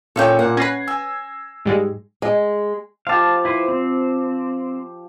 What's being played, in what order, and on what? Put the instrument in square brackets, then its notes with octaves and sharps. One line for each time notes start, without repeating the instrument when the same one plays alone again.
[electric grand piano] A#2 C#4 C#5 [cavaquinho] A4 F5 G5
[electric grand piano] A#2 A#3 [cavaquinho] F#5
[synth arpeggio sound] C#4 B4 [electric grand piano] G#6 A#6 C7
[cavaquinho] G#5 [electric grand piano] E6
[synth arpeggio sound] G#2 G3 G#3
[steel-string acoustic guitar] G#3
[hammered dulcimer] F3 G4 [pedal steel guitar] F5 A5
[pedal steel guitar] E4 B4 C5
C4